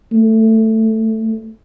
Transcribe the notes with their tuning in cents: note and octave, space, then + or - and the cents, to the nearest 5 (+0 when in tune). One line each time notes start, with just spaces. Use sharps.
A3 +10